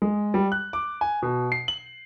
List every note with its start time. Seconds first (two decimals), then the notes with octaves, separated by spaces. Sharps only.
0.02 G#3
0.34 G3
0.52 F#6
0.73 D6
1.01 G#5
1.22 B2
1.52 C7
1.68 F#7